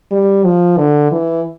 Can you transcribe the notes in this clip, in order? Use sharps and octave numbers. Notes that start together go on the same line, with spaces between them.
G3
F3
D3
E3